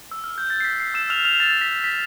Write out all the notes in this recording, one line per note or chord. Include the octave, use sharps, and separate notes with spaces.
E6
F6
G6
A6
C7
B6
C7
E6 E7
F6 F7
F6 F7
A6
B6
B6